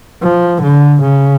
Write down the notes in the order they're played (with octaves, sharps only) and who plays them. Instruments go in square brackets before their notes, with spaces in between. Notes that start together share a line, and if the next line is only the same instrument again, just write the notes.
[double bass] F3
D3
C#3